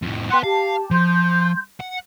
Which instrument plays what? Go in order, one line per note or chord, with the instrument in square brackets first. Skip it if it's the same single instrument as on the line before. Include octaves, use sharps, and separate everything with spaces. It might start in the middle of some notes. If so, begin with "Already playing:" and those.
[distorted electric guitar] F2 A2
[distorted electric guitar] B4 F#5 [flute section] G5 C6 F#6
[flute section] G4 A5 [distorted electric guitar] F5
[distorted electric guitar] F3 [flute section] C6 G6
[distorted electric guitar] F#5